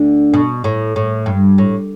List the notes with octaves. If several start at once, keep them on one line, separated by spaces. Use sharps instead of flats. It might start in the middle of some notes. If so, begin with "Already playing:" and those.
Already playing: D2 D3
B2
A2
A2
G2
A2